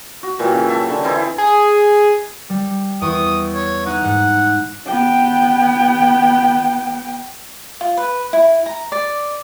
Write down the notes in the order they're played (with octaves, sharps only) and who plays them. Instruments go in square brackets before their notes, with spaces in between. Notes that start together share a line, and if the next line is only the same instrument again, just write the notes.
[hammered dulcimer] F#4
A#2 E3 F#3 G5
C#3
E5 A5
D3
E3 C4 D#4 E4
[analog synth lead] G#4
[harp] G3
[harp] E2 C#6 [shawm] D#6
[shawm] C#5
[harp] D#4 [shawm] F#5
[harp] G#2 [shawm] F#5
[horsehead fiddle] B3 G5
[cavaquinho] F4
B4
E4
A#5
D5